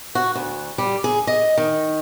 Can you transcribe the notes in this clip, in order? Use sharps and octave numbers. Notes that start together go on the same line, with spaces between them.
F#4
D2
G3
G#4
D#5
D#3